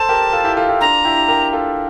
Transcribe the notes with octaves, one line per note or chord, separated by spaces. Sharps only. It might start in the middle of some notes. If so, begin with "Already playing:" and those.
Already playing: A4 C5 A5
G4 A#4
F4 A4
E4 G4
F4 A4
E4 G4
D4 F4 A#5
E4 G4
G4 A#4
F4 A4